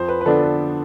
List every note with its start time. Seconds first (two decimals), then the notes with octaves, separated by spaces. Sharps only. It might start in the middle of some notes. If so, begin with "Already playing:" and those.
Already playing: F2 C5
0.08 B4
0.21 B4
0.26 D3 F3 B3 D4 A4
0.43 B4